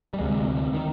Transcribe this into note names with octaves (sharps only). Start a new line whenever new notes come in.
G3
D2 C3 G#3
D#3